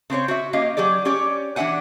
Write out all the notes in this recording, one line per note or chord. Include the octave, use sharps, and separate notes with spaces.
C#3 C4 C5 C#5
F#4 E5
A#3 C#4 G4 D#5 F5
F#3 G4 G#4 D5
C#4 G4 C#5 D5
E3 D4 C#5 E5 F#5 G#5